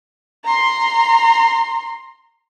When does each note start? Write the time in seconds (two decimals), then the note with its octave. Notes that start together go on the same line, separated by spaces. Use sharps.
0.44 A#5 C6